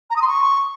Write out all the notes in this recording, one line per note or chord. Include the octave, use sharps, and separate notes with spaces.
A#5
D#6
C6
C#6